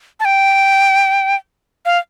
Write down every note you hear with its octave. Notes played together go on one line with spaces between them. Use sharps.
A5
G5
F5